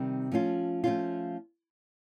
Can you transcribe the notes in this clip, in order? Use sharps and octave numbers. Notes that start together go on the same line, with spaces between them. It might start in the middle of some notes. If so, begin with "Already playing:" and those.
Already playing: C3 D#3 G3 C4
F3 A3 C#4 F4
F3 A3 C#4 F4